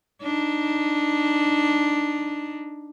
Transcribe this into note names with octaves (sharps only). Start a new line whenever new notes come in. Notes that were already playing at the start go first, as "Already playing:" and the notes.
D4 D#4